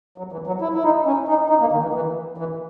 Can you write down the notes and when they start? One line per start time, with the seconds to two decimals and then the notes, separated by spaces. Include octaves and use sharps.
0.18 F#3
0.32 E3
0.47 F#3
0.61 E4
0.74 E4
0.84 D#4
1.06 C#4
1.28 D#4
1.50 D#4
1.61 A#3
1.72 D#3
1.82 E3
1.94 E3
2.38 E3